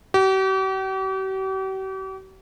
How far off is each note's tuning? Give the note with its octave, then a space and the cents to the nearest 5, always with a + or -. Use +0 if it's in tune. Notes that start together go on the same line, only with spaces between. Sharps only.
G4 -45